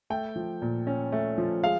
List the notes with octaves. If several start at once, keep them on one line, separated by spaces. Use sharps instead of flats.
A3 G5
F3
A#2
C#4
A3
F3
G#3 F5